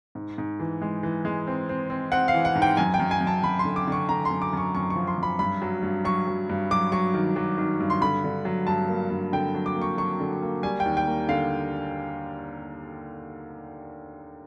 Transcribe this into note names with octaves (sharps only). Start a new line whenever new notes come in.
G#2
G#2
E3
G#3
E3
G#3
C4
C4
C4
C4 F#5
F5
E3
F#5
G#2
G5
F#2 G#5
G5
F#2
G#5
F#2
A5
F#2 B5
C6
D3
D6
D3 C#6
D3 A#5
C6
F#2
D6
F#2 C#6
F#2 C#6
C#6
F3
C6
F#2 B5
G2 B5
F#3
G2
F#3 C#6
F#3
G2
F#3 D6
F#3 C#6
D#3
F#3
D#3
G2
C6
D3 B5
D3
F#3
G2 A5
A#3
G2
D3 G5
F#3
D6
A#3
C#6
F#3 C#6
D3
A#3
G3 G#5
G5
D#2
G5
A#3
D3 F5